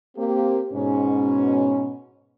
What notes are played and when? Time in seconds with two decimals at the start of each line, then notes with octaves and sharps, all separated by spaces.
0.17 A#3 C4 G4
0.73 G#2 B2 C#4